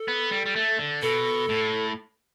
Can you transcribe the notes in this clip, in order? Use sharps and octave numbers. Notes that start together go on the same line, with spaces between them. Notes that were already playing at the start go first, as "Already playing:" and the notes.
Already playing: A4
B3
G3
G3
A3
D3
B2 A4
A2